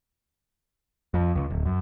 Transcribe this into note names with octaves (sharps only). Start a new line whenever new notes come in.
F2
C#2
D1
F#2